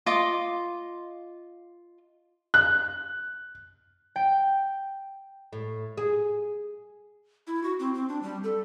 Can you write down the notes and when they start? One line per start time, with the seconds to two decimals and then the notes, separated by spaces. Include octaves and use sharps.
0.06 F4 D#5 C6 D6
2.54 F#6
4.16 G5
5.53 A2
5.97 G#4
7.47 E4
7.63 F#4
7.80 C4
7.94 C4
8.09 D4
8.23 G3
8.44 A4